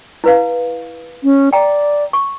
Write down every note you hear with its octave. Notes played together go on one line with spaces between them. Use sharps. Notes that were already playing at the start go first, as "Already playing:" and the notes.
E4 B4 F5
C#4
D5 G5 A#5
C#6